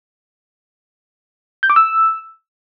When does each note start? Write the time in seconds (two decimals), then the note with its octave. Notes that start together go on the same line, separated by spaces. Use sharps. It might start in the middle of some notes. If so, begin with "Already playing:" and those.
1.63 G6
1.70 D6
1.76 E6